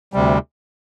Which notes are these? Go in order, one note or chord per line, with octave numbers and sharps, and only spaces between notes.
D2 C3 G3